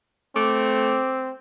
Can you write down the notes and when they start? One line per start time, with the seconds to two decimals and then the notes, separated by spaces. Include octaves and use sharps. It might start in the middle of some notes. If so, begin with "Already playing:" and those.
0.36 A3 C4 D6